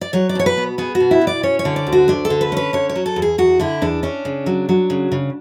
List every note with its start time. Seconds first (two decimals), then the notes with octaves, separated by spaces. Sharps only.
0.01 D5
0.13 F#3 C#5
0.29 D5
0.35 B2 C#5
0.46 B4
0.57 B3
0.78 B3 G#4
0.95 F#4
1.00 B2
1.11 E4
1.21 B2
1.27 D5
1.43 C#4 C#5
1.59 C#5
1.65 D3
1.76 D5
1.87 D2
1.92 F#4
2.08 D2 D4
2.25 A4
2.30 D3
2.41 B4
2.52 C#4 B4
2.73 D3 C#5
2.89 C#5
2.96 F#3
3.06 A4
3.16 E2
3.22 G#4
3.38 E2 F#4
3.60 D3 E4
3.82 E2 D4
4.03 C#4 D4
4.25 C#3
4.46 F#3
4.69 F#3
4.90 C#3
5.12 C#3